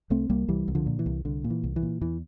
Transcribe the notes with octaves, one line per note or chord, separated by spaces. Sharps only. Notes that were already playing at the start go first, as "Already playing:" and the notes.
C2 A3 C4
C2 G3 A#3
C2 E3 G3
C2
D3 F3
A#2
E3
C2
C2 D3
A#2
E3
C2
E3
A#2
E2 E3